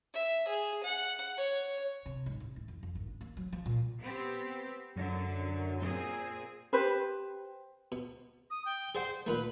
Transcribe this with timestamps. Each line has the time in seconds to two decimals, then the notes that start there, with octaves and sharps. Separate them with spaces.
0.14 E5
0.48 G#4
0.83 F#5
1.37 C#5
2.06 C3
2.26 G#2
2.40 A1
2.56 E3
2.68 F2
2.83 F2
2.95 G#1
3.07 D4
3.21 A#3
3.37 F#3
3.53 F3
3.66 A#2
4.01 B3 C4 G4
4.96 F#2 D3 F#3
5.81 A#2 C4 G#4
6.73 G4 B4 C5
7.92 B2
8.50 D#6
8.65 G5
8.95 G#4 C5 D5 F#5
9.27 A#2 D#3 A3 B4